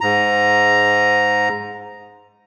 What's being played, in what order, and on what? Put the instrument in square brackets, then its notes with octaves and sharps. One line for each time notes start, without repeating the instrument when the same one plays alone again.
[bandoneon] G#2 A#5